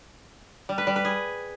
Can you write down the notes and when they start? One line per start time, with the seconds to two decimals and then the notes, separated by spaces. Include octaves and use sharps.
0.69 G3
0.78 B4
0.87 G3
0.96 B4
1.05 G#4